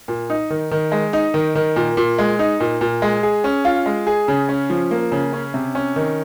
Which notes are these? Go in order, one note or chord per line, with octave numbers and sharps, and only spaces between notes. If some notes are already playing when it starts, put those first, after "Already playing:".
A#2
D#4
D#3
D#3
G#3
D#4
D#3
D#3
A#2
A#2
G#3
D#4
A#2
A#2
G#3
G#4
C#4
F4
G#3
G#4
C#3
C#4
F3
A#3
C#3
C#4
C3
C#4
D#3